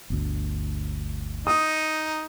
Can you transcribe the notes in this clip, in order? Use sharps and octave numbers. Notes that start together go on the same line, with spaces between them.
G1 D2
D#4 D#6